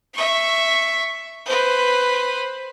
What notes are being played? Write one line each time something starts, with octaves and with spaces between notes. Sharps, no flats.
E5 C#6
B4 C5